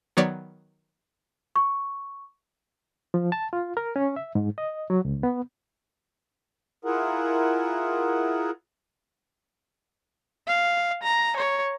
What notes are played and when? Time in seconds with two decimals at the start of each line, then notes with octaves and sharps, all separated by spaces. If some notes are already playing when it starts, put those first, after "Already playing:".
0.17 D#3 F#3 B3 C#5 D5
1.56 C#6
3.14 F3
3.32 A5
3.53 F4
3.77 A#4
3.96 C#4
4.16 E5
4.35 G#2
4.58 D#5
4.90 F#3
5.05 C#2
5.23 B3
6.85 E4 F4 G#4 A#4 F#5
10.47 F5
11.03 A#5
11.37 C#5